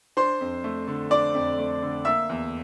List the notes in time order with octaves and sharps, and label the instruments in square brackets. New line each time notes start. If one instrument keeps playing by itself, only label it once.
[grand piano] D4 C5 C6
F2
A3
D3
D4 D5 D6
F2
A3
D3
A#3 E5 E6
E2